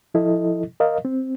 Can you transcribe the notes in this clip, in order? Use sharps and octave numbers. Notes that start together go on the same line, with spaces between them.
F3 E4 A4 D#5
A#4 D#5 F5
C4